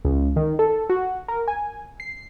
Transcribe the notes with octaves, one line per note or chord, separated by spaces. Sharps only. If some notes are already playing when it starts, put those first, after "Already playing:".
C#2
D#3
A4
F#4
A#4
G#5
C7